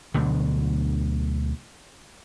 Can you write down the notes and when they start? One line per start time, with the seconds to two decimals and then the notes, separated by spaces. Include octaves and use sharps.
0.14 D2 B2 D3 F#3